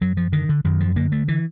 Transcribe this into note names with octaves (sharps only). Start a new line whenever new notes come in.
F#2 F#3
F3
D3 D#3
D3
F#2 D#3
F3
D3 A#3
A3
E3